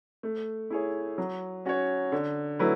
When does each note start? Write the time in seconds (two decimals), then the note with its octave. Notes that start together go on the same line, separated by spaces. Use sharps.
0.23 A3
0.70 E4 G#4 C#5
1.18 F#3
1.65 C#4 F#4 C#5
2.12 D3
2.59 F#3 A3 E4 B4